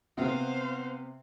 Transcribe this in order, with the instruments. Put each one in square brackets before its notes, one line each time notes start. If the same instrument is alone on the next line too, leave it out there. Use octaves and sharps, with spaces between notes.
[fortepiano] C3 [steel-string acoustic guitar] A#3 B3 F#5 [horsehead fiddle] C5 F5